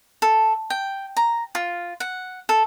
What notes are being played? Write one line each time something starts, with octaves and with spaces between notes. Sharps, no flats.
A4
G5
A#5
F4
F#5
A4